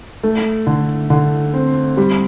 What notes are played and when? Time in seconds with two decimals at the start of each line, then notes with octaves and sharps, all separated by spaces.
0.23 A3
0.67 D3
1.10 D3
1.54 C4
1.97 G3